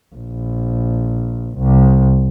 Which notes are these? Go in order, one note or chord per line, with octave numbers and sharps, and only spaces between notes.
A#1
C2